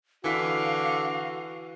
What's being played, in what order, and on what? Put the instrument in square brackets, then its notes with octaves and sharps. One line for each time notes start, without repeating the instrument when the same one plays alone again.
[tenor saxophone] D3 [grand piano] E3 B6 [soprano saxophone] F#4 [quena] F5